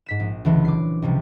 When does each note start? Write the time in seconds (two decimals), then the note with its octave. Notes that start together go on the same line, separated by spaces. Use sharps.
0.06 G#2 B6 E7
0.20 A#1
0.45 C#2 D3 E3 F#3
0.65 D6 C7
1.02 C#2 C3 F3 G3